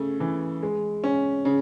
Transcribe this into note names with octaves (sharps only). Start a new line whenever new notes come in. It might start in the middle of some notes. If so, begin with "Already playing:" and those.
Already playing: C#3 A3
E3
G#3
C#4
C#3